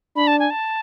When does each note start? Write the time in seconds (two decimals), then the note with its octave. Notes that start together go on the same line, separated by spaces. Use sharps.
0.16 D4 B5
0.27 A5
0.39 G#5
0.50 A5